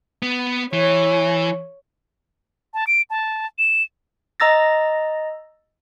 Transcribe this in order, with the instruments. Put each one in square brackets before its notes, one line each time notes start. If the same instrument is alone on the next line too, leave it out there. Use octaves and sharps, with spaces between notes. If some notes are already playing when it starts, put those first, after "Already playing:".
[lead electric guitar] B3
[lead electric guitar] E3 [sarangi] C#5
[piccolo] A5
D7
A5
E7
[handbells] D#5 A#5 E6 A6 A#6